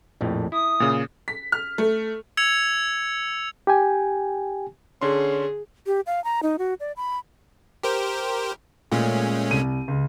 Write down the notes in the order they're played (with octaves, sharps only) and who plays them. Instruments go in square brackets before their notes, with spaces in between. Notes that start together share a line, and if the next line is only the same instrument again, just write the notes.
[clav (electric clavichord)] A#1 F2 A2
[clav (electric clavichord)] E4 [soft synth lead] D#6
[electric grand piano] A#2 C#3
[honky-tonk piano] B6
F6
A3
[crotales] E6 G#6 C#7 F7
[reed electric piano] G4 G5 G#5
[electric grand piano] D3 C6 [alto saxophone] C#4 [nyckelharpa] G#4
[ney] G4
F5
A#5
D#4
F#4
D5
B5
[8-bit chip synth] G4 A#4 C5
[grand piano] A#2 [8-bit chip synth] G#3 A3 C#4
[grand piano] C2 D#7
C#2